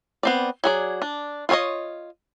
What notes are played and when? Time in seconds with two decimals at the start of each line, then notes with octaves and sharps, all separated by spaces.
0.23 B3 C4 D5
0.64 F#3 G#4 D5
1.02 D4
1.49 F4 F#4 G#4 C#5 D#5